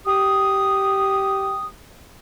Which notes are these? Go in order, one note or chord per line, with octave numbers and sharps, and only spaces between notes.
G4 D#6